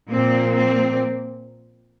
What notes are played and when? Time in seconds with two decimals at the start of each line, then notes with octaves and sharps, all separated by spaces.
0.10 A#2 F3 A#3 C4
0.55 C4